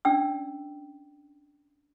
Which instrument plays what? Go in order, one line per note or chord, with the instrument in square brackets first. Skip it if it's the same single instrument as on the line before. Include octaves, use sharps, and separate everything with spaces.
[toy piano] C#4 D4 D5 G5 E6